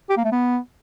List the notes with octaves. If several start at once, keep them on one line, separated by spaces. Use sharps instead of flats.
G4
A#3
A3
B3